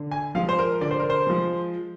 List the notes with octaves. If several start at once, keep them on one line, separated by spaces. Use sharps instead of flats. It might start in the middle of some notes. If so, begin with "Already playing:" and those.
Already playing: D3
G#5
F3 G#3 F5
C5
A#4
D3 D5
C5
A#4
C5
F3 G#3